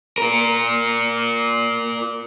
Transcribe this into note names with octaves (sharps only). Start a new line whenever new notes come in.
F4 A#4